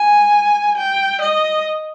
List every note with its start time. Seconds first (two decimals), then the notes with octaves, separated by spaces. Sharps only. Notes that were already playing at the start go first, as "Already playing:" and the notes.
Already playing: G#5
0.78 G5
1.22 D#5